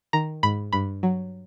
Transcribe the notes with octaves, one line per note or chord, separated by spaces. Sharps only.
D#3 A#5
G#2 B5
G2 B5
F#3